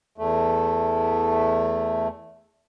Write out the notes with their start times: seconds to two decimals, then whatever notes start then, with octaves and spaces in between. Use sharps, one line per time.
0.18 E2 A3